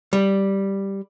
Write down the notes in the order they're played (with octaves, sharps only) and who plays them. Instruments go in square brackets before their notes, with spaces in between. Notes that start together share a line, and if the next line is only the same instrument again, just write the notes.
[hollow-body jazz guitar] G3